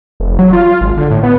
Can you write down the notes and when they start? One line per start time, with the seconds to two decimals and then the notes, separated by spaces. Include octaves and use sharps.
0.20 F1
0.39 F#3
0.53 F4
0.81 G#1
0.97 D3
1.11 A2
1.23 B3